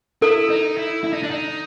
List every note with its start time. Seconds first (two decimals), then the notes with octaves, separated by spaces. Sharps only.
0.22 E4 A4
0.50 D#4
0.77 E4
1.04 E4
1.13 D#4
1.23 D4
1.31 D#4